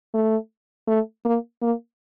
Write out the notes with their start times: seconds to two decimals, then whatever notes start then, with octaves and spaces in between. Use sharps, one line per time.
0.14 A3
0.88 A3
1.25 A#3
1.62 A#3